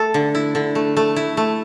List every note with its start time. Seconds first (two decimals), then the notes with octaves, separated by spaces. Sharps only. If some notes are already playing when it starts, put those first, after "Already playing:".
Already playing: A3 A4
0.14 D3
0.35 E4
0.55 D3
0.75 A3
0.97 A3
1.16 E4
1.37 A3